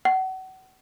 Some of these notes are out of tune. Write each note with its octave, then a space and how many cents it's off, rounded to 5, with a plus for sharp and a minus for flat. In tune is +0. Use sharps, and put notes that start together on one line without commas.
F#5 +35